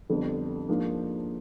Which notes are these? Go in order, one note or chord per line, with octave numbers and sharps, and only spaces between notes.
F2 D3 G3 B3
G#2 F3 A#3 D4